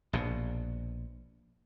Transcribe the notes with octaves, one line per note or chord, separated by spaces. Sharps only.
A#1 B2